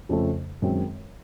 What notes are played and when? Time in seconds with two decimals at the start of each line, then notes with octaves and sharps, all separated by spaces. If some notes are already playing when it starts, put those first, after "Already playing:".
0.09 F2 C#3 F3 A3
0.62 F#2 D#3 G#3 C4